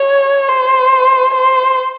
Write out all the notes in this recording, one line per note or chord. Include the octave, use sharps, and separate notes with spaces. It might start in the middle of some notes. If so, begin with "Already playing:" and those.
Already playing: C#5
C5
C5